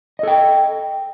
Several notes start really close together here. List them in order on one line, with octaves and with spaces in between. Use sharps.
D#5 A4 G5